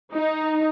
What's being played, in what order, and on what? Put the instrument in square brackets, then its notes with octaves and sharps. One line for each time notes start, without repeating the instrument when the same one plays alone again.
[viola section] D#4